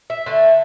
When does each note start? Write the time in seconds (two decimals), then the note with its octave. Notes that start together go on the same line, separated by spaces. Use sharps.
0.10 E5
0.26 D3 A3